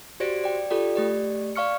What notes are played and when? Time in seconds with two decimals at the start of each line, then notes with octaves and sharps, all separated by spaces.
0.20 F#4 G4 C5 D5 A#6 D7
0.44 D5 G5
0.70 F4 G4 A4 D5 G5
0.96 A3 G4 D5
1.56 D5 F5 C#6 F6 C#7